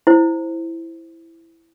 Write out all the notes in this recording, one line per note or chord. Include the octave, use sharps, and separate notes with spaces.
E4 C5